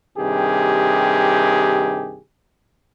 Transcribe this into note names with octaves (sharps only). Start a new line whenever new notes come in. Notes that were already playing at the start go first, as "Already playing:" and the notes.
G2 C3 D#3 G4 G#4